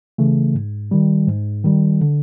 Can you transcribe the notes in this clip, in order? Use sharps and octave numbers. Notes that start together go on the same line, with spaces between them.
C#3 E3 A3
G#2
D#3 G3
G#2
D#3 G3
D3